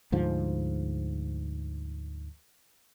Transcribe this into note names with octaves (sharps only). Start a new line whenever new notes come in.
D2 G#2 F3